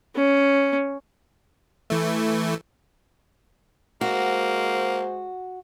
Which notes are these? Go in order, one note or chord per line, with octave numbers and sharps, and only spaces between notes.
C#4
E3 A3
G#3 A#3 F#4 C5